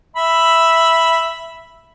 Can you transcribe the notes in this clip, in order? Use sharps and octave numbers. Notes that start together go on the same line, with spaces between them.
E5 B5